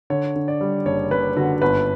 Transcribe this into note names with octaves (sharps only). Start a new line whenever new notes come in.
D3 C#5
D3
D5
G3
F#1 C#5
F#1 B4
D3 F#4
G1 B4